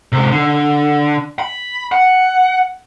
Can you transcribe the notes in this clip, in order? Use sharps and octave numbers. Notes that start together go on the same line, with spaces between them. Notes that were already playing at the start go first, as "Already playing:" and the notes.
C3 G#3
D3
B5
F#5